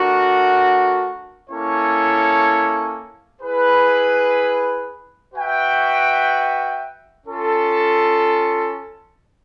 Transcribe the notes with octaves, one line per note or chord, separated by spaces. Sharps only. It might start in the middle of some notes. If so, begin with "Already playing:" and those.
Already playing: A3 D4 F#4 A#4
A#3 C#4 E4 A4 C#5
E4 G#4 B4
F#4 B4 E5 G5
C#4 F4 A4